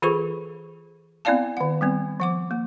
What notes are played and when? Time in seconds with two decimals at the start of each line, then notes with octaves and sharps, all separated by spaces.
0.02 E3 F4 G#4 A4 C5 C#6
1.25 B3 C4 E4 D5 F5 A5
1.57 D#3 F#5
1.81 G3 B3 C4
2.20 F3 F#5 D6
2.51 A#3